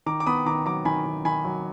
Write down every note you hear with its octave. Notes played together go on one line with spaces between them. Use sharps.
D#3 A#5 D6
D6
B3 B5 D#6
D#3 A#5 D6
F#3 A#5 D6
D#3 G#5 B5
D#3
D#3 G#5 B5
F#3